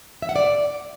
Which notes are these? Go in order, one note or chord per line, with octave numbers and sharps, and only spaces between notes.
E5
F#5
D5